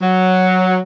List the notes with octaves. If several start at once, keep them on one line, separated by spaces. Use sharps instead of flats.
F#3